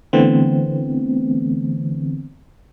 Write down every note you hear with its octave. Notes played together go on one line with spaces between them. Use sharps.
D3 E3 A3 B3 C4